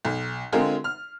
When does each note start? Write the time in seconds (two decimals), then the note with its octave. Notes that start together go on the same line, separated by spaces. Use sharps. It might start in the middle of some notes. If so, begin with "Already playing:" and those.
0.05 B1
0.52 D3 G#3 C4 F4 G#4 A#4
0.84 F6